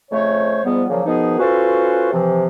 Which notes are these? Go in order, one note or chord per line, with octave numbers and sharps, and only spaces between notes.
F2 C#3 A3 C5 C#5
G#2 F3 G3 B3
A#2 C#3 F3 F#3 A#3
B2 D#3 F3 B3 D#4 G#4
C#4 F4 F#4 A4 B4 C5
C3 E3 F3